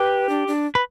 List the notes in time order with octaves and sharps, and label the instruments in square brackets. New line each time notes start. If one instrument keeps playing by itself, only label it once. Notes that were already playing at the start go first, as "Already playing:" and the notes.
Already playing: [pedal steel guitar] G4 [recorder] B4
[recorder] D4
D4
[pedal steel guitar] B4